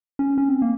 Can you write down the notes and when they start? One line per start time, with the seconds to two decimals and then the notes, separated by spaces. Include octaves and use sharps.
0.19 C#4
0.38 C#4
0.49 C4
0.62 A#3